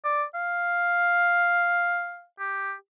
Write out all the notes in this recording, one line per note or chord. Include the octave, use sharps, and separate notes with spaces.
D5
F5
G4